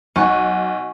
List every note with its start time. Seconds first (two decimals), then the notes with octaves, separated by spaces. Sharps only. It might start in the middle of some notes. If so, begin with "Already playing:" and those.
0.16 B1 F#5 G#5 C#6